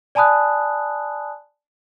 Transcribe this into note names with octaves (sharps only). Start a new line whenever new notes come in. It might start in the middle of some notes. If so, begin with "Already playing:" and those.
D5 G#5 A5 B5 D#6 F#6